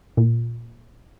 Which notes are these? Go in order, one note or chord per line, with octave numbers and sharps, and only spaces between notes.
A#2